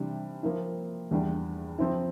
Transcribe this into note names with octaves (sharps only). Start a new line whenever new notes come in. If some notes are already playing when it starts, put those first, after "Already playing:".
Already playing: C3 E3 G3 D4
F3 A#3 E4
E2 E3 G3 D4
F3 C4 E4